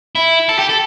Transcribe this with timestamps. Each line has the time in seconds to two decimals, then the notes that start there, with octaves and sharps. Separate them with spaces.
0.15 E4
0.49 A4
0.59 G4
0.69 A4